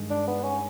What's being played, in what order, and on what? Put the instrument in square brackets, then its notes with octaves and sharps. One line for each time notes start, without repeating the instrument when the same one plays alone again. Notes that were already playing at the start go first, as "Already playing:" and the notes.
Already playing: [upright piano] G2 D#3 G#3
[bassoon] D4
B3
C#4